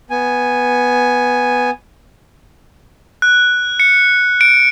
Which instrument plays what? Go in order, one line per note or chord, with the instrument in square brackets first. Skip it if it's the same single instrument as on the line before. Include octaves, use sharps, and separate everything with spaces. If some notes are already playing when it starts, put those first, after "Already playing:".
[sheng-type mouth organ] B3 G#5
[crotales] F#6
C#7
D7